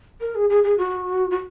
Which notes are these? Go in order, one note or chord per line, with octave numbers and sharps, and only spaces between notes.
A#4
G#4
G#4
G#4
F#4
F#4